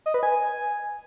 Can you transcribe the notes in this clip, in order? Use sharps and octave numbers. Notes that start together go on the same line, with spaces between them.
D#5
B4
G#5